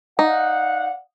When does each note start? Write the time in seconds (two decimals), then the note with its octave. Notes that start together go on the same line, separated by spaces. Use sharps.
0.19 D#4 D5 F5 F#5